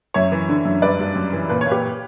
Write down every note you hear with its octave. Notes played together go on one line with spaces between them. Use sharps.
F#2 C#5 E5
E3
D3
F#2
G2 B4 D5
G2
F#2
E3
A#2 B4
A#2 C#5
G4 B4